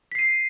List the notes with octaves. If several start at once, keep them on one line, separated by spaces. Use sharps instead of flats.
B6 C7 D#7